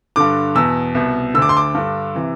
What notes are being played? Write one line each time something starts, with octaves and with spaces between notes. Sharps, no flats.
G2 D3 D6
E2 B2 E6
C2 B2
D2 D3 D6 E6
C6
D6
G2 D3
C3 E3